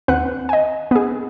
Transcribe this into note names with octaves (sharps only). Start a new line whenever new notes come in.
D#2 C4 B4 F#5 F#6
D#5 G#5
B3 G#4